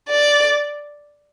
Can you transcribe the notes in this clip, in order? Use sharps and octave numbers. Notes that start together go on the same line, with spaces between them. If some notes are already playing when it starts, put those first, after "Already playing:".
D5